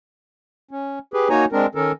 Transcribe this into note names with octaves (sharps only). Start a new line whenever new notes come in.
C#4
G4 G#4 B4
A#3 D#4 F#4 C#5 G#5 A#5
G#3 C4 D4 A#4
D#3 C#4 A4 A#4